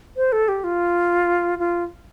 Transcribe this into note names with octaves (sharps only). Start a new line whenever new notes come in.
C5
A4
G4
F4
F4